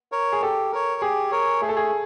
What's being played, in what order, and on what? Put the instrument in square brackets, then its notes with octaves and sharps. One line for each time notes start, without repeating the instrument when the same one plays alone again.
[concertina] A#4 C#5
[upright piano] G#4
[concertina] G4 [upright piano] A4
[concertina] A#4 C#5
[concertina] G4 [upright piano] G#4
[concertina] A#4 C#5
[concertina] A3 [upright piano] G#4
[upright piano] A4
G#4